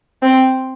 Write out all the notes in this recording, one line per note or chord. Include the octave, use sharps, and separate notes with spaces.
C4